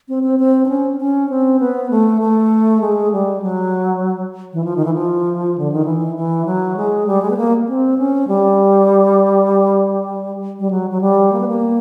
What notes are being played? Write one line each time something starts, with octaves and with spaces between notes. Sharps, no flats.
C4
C4
C4
D4
C#4
C#4
C4
B3
A3
A3
G#3
G3
F#3
E3
F3
D#3
E3
F3
D3
D#3
E3
E3
F#3
G#3
G3
G#3
B3
A#3
C4
C#4
G3
G3
F#3
F#3
G3
A#3
B3
A#3